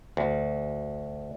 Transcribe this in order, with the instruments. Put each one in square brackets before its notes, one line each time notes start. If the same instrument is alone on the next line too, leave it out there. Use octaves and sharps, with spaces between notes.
[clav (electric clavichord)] D2